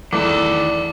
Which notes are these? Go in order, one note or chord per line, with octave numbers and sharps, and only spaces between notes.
E2 D#3 A3 A4 D5 D6